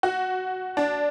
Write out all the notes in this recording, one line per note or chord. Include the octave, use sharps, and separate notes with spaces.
F#4
D4